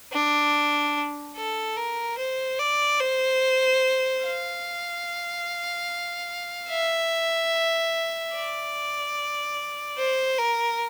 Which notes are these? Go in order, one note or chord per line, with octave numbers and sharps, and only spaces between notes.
D4
A4
A#4
C5
D5
C5
F5
E5
D5
C5
A#4